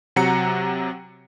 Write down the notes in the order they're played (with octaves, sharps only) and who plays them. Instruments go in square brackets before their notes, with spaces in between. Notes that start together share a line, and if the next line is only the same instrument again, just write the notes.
[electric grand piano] C3 F#3 F#5 A#5 C#7